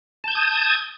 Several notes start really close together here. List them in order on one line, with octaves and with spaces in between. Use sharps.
A5 G6 G#6 D#6